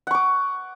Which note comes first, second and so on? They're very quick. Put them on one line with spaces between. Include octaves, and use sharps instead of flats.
F#5 C#6 D6